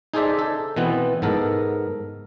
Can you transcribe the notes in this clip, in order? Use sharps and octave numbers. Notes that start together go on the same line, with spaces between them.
D#4 G#4 A4 C5 D5 E5
A4
B2 E3 B3 C4
G#2 B3 A4 A#4